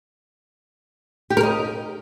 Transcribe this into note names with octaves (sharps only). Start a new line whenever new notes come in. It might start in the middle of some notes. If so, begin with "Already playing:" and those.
G4
A#4
D#5